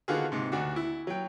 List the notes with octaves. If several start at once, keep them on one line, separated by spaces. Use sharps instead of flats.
D3 D#3 B3 F4 F#4 G#4
G#2 C3
D2 D4 F#4
E4
F#3 G5